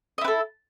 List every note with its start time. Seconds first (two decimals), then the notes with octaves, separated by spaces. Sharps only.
0.18 D#5
0.21 E4
0.24 B4
0.28 A4